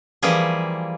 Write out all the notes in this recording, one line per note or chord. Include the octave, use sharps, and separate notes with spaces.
E3 F3 G3 A#3 G#4